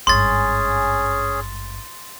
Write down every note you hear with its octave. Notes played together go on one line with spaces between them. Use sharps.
G#1 G2 C#4 G#4 C6 A6